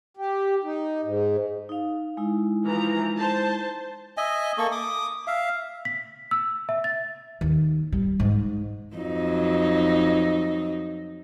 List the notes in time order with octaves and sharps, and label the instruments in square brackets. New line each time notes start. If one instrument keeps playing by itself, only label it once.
[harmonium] G4
D#4
G#2
[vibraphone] D#4 F5
G#3 D#4 E4
[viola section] E3 F3 A#5
C5 A5
[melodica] D#5 E5 G#5
A#3 A4 C#6
D6 D#6
E5 F5
[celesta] B6
E6
E5
A6
[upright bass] D#2
G3
G#2
[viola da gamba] F2 F#3 D#4